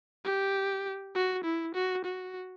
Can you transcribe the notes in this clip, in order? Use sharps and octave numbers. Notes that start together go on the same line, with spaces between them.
G4
F#4
E4
F#4
F#4